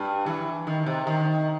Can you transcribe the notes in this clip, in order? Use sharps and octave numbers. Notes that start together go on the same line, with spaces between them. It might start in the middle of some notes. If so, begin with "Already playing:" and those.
Already playing: G2
E3
D#3
C3
D#3